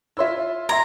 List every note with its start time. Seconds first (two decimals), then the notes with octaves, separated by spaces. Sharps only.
0.17 E4 F4 C#5 E5 C6 E6
0.69 E5 A#5 C6 G#6